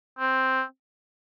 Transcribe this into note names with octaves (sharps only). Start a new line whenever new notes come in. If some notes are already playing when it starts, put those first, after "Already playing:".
C4